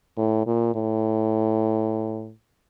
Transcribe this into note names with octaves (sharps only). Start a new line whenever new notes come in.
A2
A#2
A2